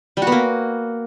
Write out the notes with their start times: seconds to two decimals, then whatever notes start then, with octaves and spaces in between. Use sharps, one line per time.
0.17 G3
0.22 F#4
0.27 B3
0.32 A#3